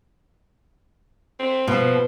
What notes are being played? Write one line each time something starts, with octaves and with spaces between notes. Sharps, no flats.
C4
B2 F3